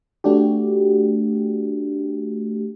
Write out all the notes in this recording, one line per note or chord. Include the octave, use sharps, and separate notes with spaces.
A3 D4 F#4 G4